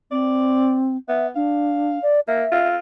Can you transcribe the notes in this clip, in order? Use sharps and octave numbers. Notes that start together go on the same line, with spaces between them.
C4 D5
B3 E5
D4 F5
D5
A#3 E5
F4